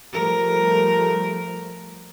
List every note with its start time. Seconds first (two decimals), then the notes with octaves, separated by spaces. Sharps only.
0.13 F3 G3 A3 A#4